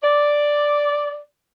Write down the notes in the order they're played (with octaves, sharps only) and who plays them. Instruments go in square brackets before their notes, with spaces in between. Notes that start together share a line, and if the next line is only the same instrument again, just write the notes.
[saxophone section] D5